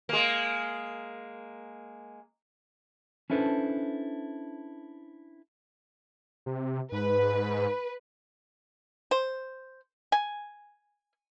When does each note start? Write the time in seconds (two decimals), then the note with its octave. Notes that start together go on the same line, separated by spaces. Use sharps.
0.09 G#3 A#3
3.30 C#4 D4 E4 A4 B4 C5
6.46 C3
6.92 G#2 B4
9.11 C5
10.12 G#5